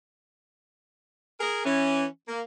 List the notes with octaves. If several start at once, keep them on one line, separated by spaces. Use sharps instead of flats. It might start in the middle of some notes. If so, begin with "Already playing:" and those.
G#4 A#4
E3 C#4
A#3